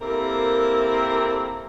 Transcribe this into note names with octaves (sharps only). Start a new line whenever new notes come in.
A#3 C4 E4 G4 A4 A#4